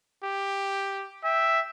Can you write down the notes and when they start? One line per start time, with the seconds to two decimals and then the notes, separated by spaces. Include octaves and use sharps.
0.23 G4
1.24 E5 G5